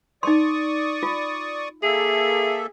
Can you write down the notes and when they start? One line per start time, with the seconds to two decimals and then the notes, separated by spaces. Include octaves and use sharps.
0.23 D#4 D5 C6 C#6 D#6
1.03 F4
1.83 A#3 G#4 A4 E5